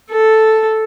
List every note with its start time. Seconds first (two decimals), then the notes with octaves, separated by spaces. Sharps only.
0.10 A4